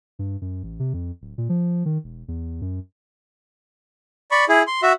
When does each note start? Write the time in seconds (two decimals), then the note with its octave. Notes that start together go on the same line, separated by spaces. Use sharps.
0.19 G2
0.41 F#2
0.63 A1
0.80 C3
0.94 F2
1.21 D1
1.38 A#2
1.49 F3
1.86 D#3
2.04 E1
2.28 E2
2.61 F#2
4.31 D5 B5 C#6
4.49 E4 G#4
4.67 C6
4.83 F#4 E5